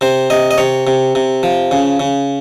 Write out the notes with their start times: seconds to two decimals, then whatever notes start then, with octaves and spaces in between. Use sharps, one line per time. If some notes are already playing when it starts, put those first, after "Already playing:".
0.01 C3 C5
0.30 C3 D#5
0.51 D#5
0.58 C3 C#5
0.87 C3
1.15 C3
1.43 F3
1.71 C#3
2.00 C#3